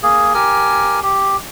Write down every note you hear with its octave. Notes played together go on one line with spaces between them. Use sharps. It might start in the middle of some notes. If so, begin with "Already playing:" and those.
A#3 G#4
G4 A#4 G#5
G4